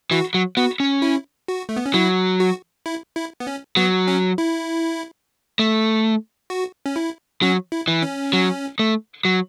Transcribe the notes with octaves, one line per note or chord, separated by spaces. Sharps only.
E3 F#4
F#3
B3 F#4
C#4
E4
F#4
A3
B3
C#4
F#3 E4
F#4
E4
E4
B3
C#4
F#3 B3
C#4
E4
A3
F#4
C#4
E4
F#3 C#4
E4
E3
C#4
F#3
A3
F#3